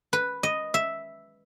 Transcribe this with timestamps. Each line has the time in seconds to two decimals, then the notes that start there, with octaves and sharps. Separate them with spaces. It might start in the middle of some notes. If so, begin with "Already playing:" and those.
0.13 B4
0.43 D#5
0.74 E5